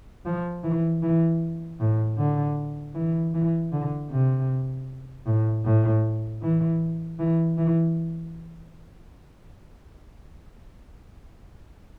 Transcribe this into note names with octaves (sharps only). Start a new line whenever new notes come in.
F3
E3
E3
A2
D3
E3
E3
D3
C3
A2
A2
E3
E3
E3